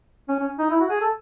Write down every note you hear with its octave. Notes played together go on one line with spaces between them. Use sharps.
C#4
C#4
D#4
E4
F#4
G#4
A4